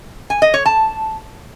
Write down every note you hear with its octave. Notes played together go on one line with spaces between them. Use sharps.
G#5
D#5
C#5
A5